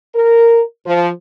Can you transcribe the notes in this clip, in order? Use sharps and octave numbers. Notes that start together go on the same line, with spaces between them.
A#4
F3